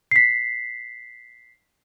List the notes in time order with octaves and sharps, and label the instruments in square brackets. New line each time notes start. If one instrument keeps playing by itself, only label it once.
[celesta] B6 C7